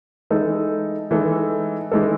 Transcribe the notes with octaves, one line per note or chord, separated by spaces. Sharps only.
E3 G#3 D#4 A4
E3 G#3 D#4 A4
E3 G#3 D#4 A4